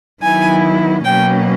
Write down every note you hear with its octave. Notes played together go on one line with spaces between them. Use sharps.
D#3 F#3 B3 E4 G#5
B2 F#3 A#3 C#4 G5